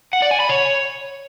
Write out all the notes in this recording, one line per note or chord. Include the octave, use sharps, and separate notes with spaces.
F#5
D5
G#5
B5
C#5